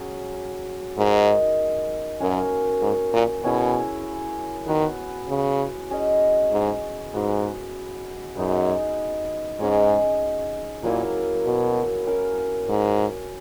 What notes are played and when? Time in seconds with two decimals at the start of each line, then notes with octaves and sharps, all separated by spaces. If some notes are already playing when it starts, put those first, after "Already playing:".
Already playing: F#3 C#4 G#4
0.97 G#2 G#3 D#4 A#4
2.20 F#2 A#3 C#4 F#4 A#4
2.82 G#2
3.13 A#2
3.43 B2 C#4 E4 G#4
4.67 D#3 B3 F#4 B4
5.29 C#3
5.91 C#4 G#4 D#5
6.52 G#2
7.14 G#2 B3 F#4 B4
8.37 F#2 B3 D#4 G#4
9.60 G#2 C#4 G#4 D#5
10.83 A#2 F#3 A#3 E4
11.45 B2
12.07 C#4 F#4 A#4
12.69 G#2